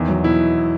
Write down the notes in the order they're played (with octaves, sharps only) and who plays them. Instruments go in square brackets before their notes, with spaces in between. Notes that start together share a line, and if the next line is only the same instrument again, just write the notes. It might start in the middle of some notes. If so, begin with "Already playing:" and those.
Already playing: [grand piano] E2 D#3
F#3
B2 E4